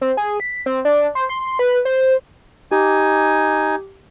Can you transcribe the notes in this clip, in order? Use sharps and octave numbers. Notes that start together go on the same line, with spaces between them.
C4
G#4
B6
C4
D4
C5
C6
B4
C5
D#4 G4 G#5